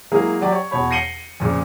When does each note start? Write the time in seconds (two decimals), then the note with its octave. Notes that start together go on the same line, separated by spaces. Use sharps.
0.11 E3 F#3 G#3 A#3 G#4 A#4
0.41 F#3 G4 D5
0.52 C#5
0.71 E2 B2 C#5 B5
0.91 A#6 C7 C#7 D#7 F#7 G7
1.40 F2 A#2 C#3